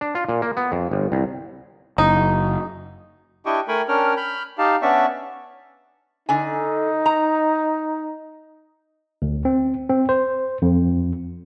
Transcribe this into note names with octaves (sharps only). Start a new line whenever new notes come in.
D4
F4
A#2
A#3
B3
F2
G1
C2
F#1 D#4
D4 E4 G4 D#5 G5 C#6
A3 A#4 G5 G#5 B5 C#6
C#4 D4 A#4 C#5 G5 F6
B5 F6 G6
D#4 G4 F5 A5
B3 C#4 D4 D5 E5 C#6
D3 D#4 G#5
A#5
D2
C4
C4
C5
F2